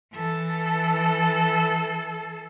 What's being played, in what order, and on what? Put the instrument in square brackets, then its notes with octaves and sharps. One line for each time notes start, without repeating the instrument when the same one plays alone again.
[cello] E3 A4